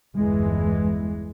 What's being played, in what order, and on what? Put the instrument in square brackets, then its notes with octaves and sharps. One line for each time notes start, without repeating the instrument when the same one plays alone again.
[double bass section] G1 E2 E3 G#3